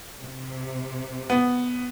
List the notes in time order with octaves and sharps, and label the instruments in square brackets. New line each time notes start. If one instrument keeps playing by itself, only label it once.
[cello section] C3
[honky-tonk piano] B3